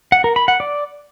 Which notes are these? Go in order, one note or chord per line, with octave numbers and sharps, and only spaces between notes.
F#5
A#4
B5
F#5
D5